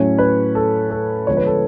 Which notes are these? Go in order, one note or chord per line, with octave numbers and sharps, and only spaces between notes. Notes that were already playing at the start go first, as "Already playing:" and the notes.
Already playing: A2 F#3 A3 C#4 C#5
B4
A4
A4
D3 F3 G#3 B3 C#5
B4
A4